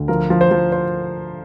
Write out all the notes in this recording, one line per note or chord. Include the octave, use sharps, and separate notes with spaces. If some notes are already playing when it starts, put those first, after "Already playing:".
Already playing: D2
F3 A#4
F3
C5
F3
C5